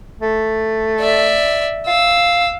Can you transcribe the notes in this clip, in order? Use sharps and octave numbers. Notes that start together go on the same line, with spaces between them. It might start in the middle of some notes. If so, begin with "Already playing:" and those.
A3
D5 E5
F5 E6